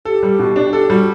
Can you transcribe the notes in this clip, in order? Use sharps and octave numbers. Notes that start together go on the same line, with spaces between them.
G4 A4
G3
B2
D4
G4 A4
G3 F#4